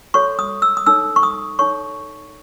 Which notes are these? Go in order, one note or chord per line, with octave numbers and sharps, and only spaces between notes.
F#4 A4 C#5 C#6
D#6
E6
D#6
D#4 A4 C#5 E6
C#6
D#6
D#4 A4 C#5 C#6